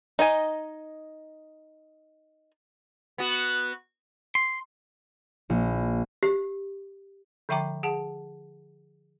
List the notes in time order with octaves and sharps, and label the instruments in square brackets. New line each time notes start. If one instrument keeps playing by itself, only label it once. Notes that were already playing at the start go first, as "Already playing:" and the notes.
[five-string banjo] D#4 D#5 G#5
[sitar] B3 F#4
[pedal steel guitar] C6
[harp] A#1
[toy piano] G4
[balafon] D3 F3 E5 G5 A#5 D6
G#4 F#5 A5